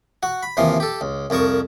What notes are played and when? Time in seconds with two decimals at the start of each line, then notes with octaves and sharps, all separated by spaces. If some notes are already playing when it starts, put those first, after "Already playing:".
0.23 F#4 F#5
0.43 B5
0.57 D#2 C3 E3 F3 C6
0.80 G4 A4
1.01 C#2
1.30 C2 F2 A#4 A5 C#6